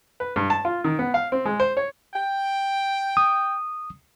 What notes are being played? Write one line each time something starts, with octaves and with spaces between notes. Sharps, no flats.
B4
G2
A5
F4
D#3
B3
F5
C4
G#3
C5
C#5
G5
D#6